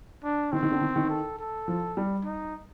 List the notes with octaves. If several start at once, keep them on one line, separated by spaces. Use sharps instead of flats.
D4
D#3 C4
D#3
D3
D#3
D#3
A4
A4
F3
G3
D#4